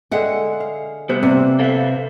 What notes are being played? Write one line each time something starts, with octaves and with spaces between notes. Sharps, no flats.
D3 G#3 E5 F#5 G5
F5
C3 G3 B3 C5 F5 F#5
C3 A#3 C4 D4
A4 B4 C5 E5 F5